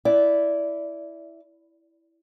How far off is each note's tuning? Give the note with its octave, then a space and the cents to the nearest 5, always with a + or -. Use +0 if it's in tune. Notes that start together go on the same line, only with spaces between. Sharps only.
E4 +0 D5 -15